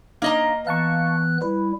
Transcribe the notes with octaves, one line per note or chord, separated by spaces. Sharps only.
A#3 D4 D#4 D#5 F5 A#5
E3 B3 F5 A5 C#6 F#6
G3 E4 B4